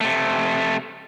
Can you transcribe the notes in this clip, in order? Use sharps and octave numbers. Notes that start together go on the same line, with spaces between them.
C3 A3